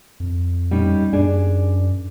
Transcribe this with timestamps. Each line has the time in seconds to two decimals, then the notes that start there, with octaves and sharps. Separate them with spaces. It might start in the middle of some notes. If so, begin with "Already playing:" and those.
0.20 F2
0.71 G3 C#4 D#4
1.13 F#2 D4 G#4